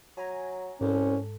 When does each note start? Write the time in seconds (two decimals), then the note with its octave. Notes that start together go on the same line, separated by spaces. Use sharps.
0.17 F#3 G#5 A#5
0.81 C2 G#2 C#4 A4